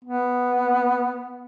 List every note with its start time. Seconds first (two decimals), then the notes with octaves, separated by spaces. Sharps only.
0.04 B3